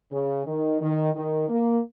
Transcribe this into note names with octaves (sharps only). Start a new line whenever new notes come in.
C#3
D#3
D#3
D#3
A#3